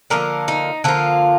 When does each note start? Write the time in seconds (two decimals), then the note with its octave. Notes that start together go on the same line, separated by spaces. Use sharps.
0.10 D3 F3 A#3 A#4
0.48 D#4
0.84 D3 F3 A#3 F4